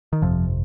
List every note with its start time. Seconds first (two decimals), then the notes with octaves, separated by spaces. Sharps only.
0.13 D#3
0.22 G1 F2 C3 F3